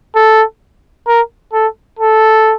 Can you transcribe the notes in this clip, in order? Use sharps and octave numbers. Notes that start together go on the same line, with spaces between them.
A4
A#4
A4
A4